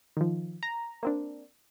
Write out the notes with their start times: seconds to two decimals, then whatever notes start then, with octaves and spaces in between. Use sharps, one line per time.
0.17 D#3 F3
0.63 A#5
1.03 A#3 C4 D4